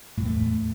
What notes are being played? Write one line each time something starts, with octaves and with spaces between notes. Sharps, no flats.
E2 A2 A3